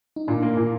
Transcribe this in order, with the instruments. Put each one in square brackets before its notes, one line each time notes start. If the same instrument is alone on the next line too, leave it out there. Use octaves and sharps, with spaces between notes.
[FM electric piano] D#4
[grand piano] A#2 [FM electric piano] D4
[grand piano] A#3
A#2